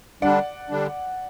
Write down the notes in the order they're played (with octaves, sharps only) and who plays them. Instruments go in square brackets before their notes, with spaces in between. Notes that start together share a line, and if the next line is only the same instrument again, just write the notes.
[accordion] D3 G3 D4 [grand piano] D5 F#5
[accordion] D3 G3 D4